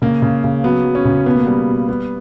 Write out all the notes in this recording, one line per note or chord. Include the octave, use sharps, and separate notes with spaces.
C#3 A#3
C#3
C#3
F#3 B3
F#3
C#4
C#3
B2 B3
A#3
G3 B3
B2
G3 B3